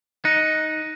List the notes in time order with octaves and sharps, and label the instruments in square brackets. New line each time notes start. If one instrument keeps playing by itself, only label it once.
[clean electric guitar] D#4 [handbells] F#6 C#7